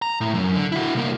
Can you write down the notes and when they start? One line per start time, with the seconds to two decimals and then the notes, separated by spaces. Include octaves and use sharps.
0.02 A#5
0.21 A2
0.34 F#2
0.55 D3
0.72 E4 F#4
0.95 C2 A#3